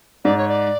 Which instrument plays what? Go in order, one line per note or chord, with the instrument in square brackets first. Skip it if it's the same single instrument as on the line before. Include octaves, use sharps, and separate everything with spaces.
[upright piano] G#2 [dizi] D5
[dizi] C#5
D5